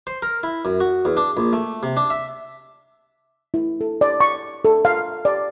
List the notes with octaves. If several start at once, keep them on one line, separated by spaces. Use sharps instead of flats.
C5
A#4
E4
F#2
F#4
E2
D4
A#1
A3
C3
D4
E5
E4
A4
D5
C#6
A4
F5
D5